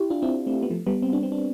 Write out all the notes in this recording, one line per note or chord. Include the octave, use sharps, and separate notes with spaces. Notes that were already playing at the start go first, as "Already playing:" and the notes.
Already playing: E4 G4
D4 F4
C4 E4
A3 C4
B3
F3 A3
G3 B3
C4
D4
C4
D4